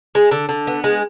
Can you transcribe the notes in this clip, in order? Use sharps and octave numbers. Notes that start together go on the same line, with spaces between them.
G#3
D3
D3
B3
G#3